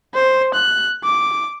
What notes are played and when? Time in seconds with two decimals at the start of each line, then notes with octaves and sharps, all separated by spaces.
0.15 C5
0.54 F#6
1.04 D6